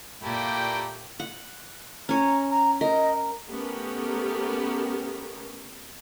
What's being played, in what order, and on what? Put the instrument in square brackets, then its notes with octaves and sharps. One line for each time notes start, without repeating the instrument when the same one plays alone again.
[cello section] A#2 G4 [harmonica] A3 A#3 E4 [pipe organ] G5
[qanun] F#5
[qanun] C#4 C#5 [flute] A#5
[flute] A#5
[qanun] A#4 [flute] D#5
[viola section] A3 B3 C#4 G4 A#4